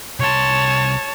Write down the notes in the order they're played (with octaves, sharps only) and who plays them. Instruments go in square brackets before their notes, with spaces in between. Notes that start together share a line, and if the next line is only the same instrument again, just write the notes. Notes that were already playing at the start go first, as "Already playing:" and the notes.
[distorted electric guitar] C2 C6 [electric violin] C#5 A5